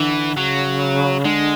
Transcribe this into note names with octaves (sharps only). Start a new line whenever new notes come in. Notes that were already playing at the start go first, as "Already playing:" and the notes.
Already playing: D3 E3
C#3 F#3
D3 G#3